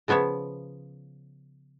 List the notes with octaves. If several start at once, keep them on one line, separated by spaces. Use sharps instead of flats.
C#3 F3 B3 C#5 E5